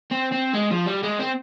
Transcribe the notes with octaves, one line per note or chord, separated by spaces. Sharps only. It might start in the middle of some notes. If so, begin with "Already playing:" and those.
C4
C4
G#3
F3
G3
G#3
C4